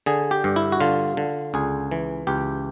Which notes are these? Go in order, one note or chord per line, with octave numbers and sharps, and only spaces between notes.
D3 G#4
G4
G2
E4
F#4
D3 F4
D3
C#2 G#4
E3
C#2 G4